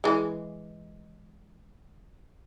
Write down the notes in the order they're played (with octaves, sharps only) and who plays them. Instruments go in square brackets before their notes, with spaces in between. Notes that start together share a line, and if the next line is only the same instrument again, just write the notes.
[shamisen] E3 G#3